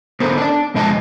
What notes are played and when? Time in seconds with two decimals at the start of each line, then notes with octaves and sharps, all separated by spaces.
0.20 D3 B3 A4 A#4 C5
0.38 D4 D5
0.74 F2 B2 D3 G#3 D#5 A5